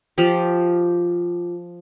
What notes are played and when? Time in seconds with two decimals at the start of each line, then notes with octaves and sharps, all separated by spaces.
0.18 F3 F4 G4 D6